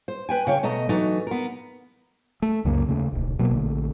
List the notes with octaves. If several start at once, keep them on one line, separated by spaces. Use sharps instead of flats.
C5
B4 G5 G#5
C#3 C#5 G5
B2 A3 D#5 A#5
E3 F#3 A3 D#4
B3 A#4
A3
C#2 F#2 C#3 A#3
D#2 C#3 A3
D1 B1
B2 F#3 A#3
A#1 D3 A3